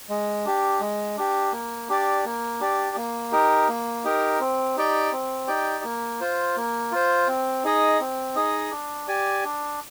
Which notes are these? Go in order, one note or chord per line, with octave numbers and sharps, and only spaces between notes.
G#3
D4 G4
G#3
D4 G4
A#3
D4 G4 D5
A#3
D4 G4 D5
A#3
D#4 G4 A#4
A#3
D#4 G4 A#4
C4
D#4 G4 D5 G5
C4
D#4 G4 D5 G5
A#3
F4 C5
A#3
F4 C5
C4
D#4 G#4 D#5
C4
D#4 G#4 D#5
D4
G4 D5 G#5
D4